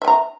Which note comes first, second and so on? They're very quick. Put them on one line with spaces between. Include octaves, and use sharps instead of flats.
E5 G#5 A#5